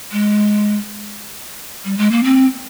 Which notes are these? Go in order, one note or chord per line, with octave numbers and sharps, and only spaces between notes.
G#3
G3
G#3
A#3
C4